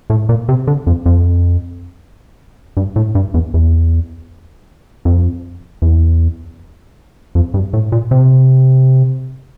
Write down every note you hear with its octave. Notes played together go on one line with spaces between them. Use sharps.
A2
A#2
C3
D3
F2
F2
G2
A2
G2
E2
E2
F2
E2
F2
G2
A2
A#2
C3